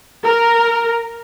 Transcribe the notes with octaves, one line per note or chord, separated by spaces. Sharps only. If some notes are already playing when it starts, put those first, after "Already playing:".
A#4